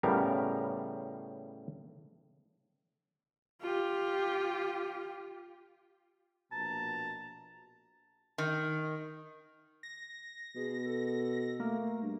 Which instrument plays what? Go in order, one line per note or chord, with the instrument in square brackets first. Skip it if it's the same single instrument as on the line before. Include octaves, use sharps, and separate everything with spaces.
[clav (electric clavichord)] A2 C#3 G3 B3 A#4 F5
[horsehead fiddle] F4 G4
[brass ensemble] A#1 B2 A#5 [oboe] A5
[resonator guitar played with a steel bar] D#3
[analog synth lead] A#6
[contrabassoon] B2 [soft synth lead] G#4
[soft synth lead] A4
[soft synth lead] A3 [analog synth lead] A#3
[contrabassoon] G2